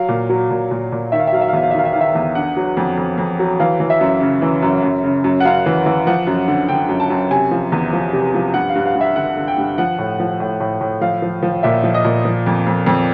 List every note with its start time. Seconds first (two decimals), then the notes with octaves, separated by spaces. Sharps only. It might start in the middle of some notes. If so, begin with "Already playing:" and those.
Already playing: F#3 F5
0.09 A#2
0.29 F#3
0.50 A#2
0.71 A#2
0.92 A#2
1.12 D#3 E5
1.19 F5
1.27 E5
1.32 F#3 F5
1.41 E5
1.48 F5
1.53 E2 E5
1.63 F5
1.71 E5
1.74 D#3 F5
1.85 E5
1.93 D#3 F5
2.01 E5
2.15 E2
2.35 D3 F#5
2.56 F#3
2.77 F2
2.98 F2
3.18 F2
3.40 F#3
3.60 E3 F5
3.80 E3
3.90 E5
4.01 F#2
4.21 C#3
4.42 E3
4.63 F#2
4.83 F#2
5.04 C#3
5.24 F#2
5.40 F#5
5.45 F#2 F5
5.66 E3
5.86 E3
6.07 F3 F#5
6.27 F#2
6.48 D3
6.68 D3 G5
6.89 F#2
7.00 A5
7.10 F#2
7.31 C3 G#5
7.51 F3
7.72 E2
7.93 F3
8.13 C3
8.34 F3
8.54 G2 F#5
8.69 F5
8.75 G2
8.85 F5
8.95 G2
9.01 E5
9.16 D3 F#5
9.37 D3
9.48 G5
9.58 G2
9.78 F3 F#5
9.98 A2
10.19 F3
10.40 A2
10.60 A2
10.81 A2
11.01 F3 F5
11.22 F3
11.43 F3
11.63 A#2 E5
11.83 F3
11.94 D#5
12.05 A#2
12.25 F3
12.46 F2
12.67 F2
12.86 F2